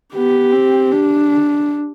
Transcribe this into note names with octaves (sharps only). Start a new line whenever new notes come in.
B3 G4
C4
D4